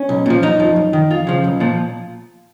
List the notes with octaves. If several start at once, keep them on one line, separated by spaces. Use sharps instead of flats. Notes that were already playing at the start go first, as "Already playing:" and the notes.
Already playing: C#4
B1
A#2 F3
F#2 D#4
F3
F#2
D#3
F2 F4
C#3 F3
B1
A#2 F3